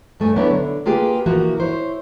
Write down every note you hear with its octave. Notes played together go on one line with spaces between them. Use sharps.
G2 A3 G#5
F#3 B3 C#4 D4 E4
D3
A#3 F4 G4 G#4 B4
E3 F3 A#3 F#4 A#4
E4 C5 C#5